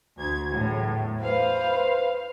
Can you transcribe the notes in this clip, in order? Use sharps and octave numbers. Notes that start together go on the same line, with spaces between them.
D2 G#6
E2 A2 F#3
B4 C5 F5